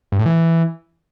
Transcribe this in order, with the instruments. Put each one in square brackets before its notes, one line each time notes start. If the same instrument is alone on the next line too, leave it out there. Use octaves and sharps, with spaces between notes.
[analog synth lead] G2
A2
E3